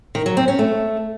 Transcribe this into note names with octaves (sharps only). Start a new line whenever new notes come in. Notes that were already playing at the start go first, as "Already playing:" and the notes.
D#3
F#3
C4
C#4
A3